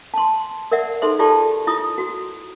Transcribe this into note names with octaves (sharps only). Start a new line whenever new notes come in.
A5 C6
A#4 D5 E5 F#5
D#4 G#4 A4 C5 E5 C6
F4 G4 A4 D5 A5
E4 F4 D#6
F#4